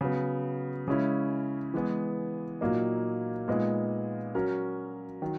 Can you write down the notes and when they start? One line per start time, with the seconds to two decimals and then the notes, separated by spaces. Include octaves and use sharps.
0.01 C#3 F#3 B3
0.88 C#3 G#3 C#4 E4
1.74 E3 G#3 B3
2.61 A#2 F#3 A#3 D#4
3.48 A#2 G#3 B3 D#4
4.35 F#3 C#4 F#4 A#4
5.22 D#3 F#3